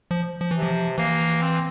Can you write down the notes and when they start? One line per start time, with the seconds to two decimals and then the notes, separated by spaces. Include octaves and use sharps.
0.11 F3
0.40 F3
0.51 C3 E3
0.63 F3
0.98 E3 A#3
1.42 C4